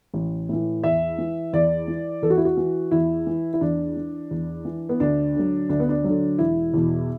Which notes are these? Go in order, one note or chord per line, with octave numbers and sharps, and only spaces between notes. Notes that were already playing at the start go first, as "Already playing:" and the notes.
A1
A2 E3
E2 E5
E3
E2 D5
E3
E2 A4
F#4
E4
F#4
E3
E2 E4
E3
E4
E2 D4
E3
E2
E3
B3
D2 D4
D3 F#3
D2 D4
B3
D4
D3 F#3
E1 E4
E2 B2